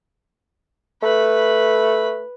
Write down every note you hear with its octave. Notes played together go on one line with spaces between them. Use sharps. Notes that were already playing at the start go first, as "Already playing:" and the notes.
A3 B4 B5